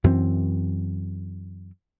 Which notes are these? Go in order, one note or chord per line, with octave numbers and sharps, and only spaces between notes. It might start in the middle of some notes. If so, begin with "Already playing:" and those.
F#2 E3 C4